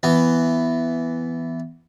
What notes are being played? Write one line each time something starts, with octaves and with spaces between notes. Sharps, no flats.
E3 B3